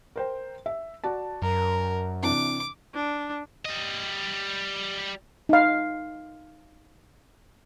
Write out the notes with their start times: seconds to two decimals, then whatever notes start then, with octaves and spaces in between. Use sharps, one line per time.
0.16 A#4 C5 G5
0.66 E5
1.04 F#4 D5 A5
1.42 F#2 A#4
2.23 C3 E3 D4 D6
2.95 D4
3.65 G3 D#5
5.49 D#4 F5